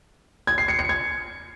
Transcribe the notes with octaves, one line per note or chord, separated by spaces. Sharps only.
G#6
C7
C#7
C#7
G#6